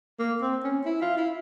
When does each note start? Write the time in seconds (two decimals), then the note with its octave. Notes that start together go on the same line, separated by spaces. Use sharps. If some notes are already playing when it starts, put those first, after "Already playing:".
0.19 A#3
0.42 C4
0.64 C#4
0.85 E4
1.02 F4
1.18 E4